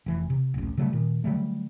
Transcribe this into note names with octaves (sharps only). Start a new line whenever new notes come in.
F1 E3
C3
D1 A1
C#3 F#3 G3 A3
A#2 D#3
D3 F#3 G3 A3